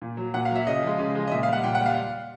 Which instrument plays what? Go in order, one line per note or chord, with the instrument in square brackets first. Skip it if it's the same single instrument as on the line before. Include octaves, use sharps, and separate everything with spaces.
[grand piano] A#2
F#3
A#2 F#5
F5
F#3 E5
C#3 D#5
F3 G#3
C#3
F3 G#3
D#5
A#2 E5
F5
G3 F#5
A#2 G5
F#5
G3 F5